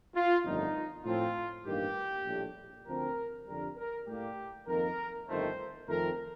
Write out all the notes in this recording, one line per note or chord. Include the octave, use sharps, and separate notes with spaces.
F4
G1 F2 D#3 A3 D#4
A2 F3 C4 F4
A1 G2 D#3 A#3 G4
A#1 A2 G3
D2 D3 F3 C4 A#4
F2 D3 G3 A#4
A#4
A2 G3 A#3 G4
F2 D#3 A#3 A#4
G1 F2 D#3 A3 C5
F2 D#3 A3 C4 A#4